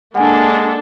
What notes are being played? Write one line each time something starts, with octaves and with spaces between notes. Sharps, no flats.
G#3 A#3 D4 A4 F#5 G#5